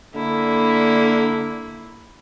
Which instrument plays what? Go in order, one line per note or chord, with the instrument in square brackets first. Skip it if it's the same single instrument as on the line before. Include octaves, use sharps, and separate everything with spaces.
[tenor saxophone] D3 [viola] A#3 E4